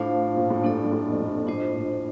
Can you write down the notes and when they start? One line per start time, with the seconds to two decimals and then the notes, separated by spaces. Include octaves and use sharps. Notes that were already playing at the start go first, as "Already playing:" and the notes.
Already playing: A2 A3 D4 F4 C5 F5
0.37 A#2
0.50 A2
0.64 G2 A#3 D4 A4 D5
0.84 G2
0.92 A2
1.10 F2
1.20 G2
1.47 A2 D4 F4 C5 D#5
1.76 A#2